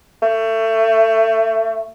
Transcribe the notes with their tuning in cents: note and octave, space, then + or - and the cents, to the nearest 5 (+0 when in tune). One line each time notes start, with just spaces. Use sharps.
A3 +25